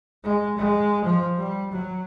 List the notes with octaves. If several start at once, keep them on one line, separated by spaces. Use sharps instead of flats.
G#3
G#3
F3
G3
F#3